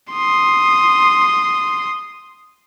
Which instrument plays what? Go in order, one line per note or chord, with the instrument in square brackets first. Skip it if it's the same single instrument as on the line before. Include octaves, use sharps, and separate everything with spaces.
[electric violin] C6 D#6